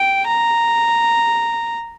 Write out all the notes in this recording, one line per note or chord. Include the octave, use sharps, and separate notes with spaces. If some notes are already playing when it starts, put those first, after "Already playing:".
Already playing: G5
A#5